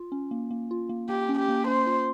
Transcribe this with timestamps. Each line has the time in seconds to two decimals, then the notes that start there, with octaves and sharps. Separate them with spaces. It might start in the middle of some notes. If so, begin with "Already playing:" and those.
Already playing: F4
0.12 C#4
0.31 A#3
0.51 A#3
0.71 F4
0.89 A#3
1.09 A#3 G4
1.29 C#4
1.39 G4
1.48 A#3
1.67 C#4 C5
1.87 F4